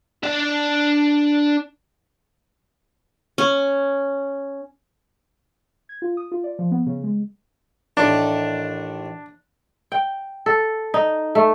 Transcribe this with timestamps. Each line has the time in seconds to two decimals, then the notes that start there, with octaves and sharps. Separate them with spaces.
0.23 D4 D5
3.38 C#4
5.89 G#6
6.02 F4
6.17 D#6
6.32 F4
6.44 D5
6.59 F3
6.71 B3
6.86 C#3
7.04 G#3
7.97 A1 D#3 D4
9.92 G5
10.46 A4
10.94 D#4
11.35 A3